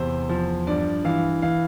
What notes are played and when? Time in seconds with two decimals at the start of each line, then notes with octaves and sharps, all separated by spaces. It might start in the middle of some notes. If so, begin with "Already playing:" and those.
Already playing: E2 C3 C5
0.29 F3
0.67 G2 D5
1.05 E3 F5
1.42 E3 F5